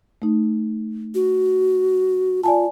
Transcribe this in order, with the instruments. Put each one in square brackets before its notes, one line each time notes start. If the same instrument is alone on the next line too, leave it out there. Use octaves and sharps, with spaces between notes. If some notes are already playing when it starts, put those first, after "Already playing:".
[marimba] A3 D#4
[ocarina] F#4
[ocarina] F4 [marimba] D5 G#5 A5